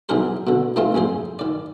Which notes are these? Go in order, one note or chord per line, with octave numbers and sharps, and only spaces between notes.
B1 E3 D4 G#4 A#4 C5
B2 D3
C3 E3 A3 C4 D#4 F4
A#1 F2 G#4 C5
D#3 D5